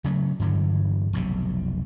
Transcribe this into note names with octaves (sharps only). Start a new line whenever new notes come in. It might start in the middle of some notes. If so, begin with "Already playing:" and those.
C#3 F#3 A3
G2 D3 E3 F#3
F1 B1 C3